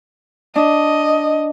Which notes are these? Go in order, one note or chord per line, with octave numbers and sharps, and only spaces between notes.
D4 D#5